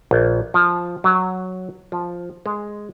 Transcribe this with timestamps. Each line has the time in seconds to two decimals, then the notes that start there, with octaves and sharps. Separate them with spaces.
0.11 A#1
0.54 F3
1.04 F#3
1.92 F3
2.46 G#3